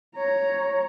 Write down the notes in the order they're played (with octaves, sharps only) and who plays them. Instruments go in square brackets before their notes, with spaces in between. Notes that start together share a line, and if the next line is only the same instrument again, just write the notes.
[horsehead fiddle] C#5 A#5